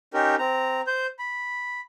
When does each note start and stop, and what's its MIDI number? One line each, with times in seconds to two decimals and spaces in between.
0.14 0.36 61
0.14 0.36 63
0.14 0.36 67
0.14 0.36 70
0.39 0.81 60
0.39 0.81 82
0.87 1.07 72
0.87 1.07 91
1.19 1.81 83